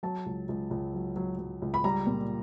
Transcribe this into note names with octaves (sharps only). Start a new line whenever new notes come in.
F#3 A5
C#2
C#2
C#2
F#3
F#3
F#3
C#2
B5
G3 A#5
A#2